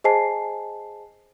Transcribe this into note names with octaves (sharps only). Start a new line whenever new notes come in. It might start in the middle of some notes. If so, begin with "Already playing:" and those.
G#4 C5 D#5 G#5 A5 C7